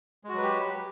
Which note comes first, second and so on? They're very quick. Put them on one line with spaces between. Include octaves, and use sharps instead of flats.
G#3 F#4 F#3 B4 G4